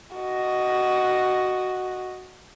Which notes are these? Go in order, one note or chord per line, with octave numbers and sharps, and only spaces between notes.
F#4 D#5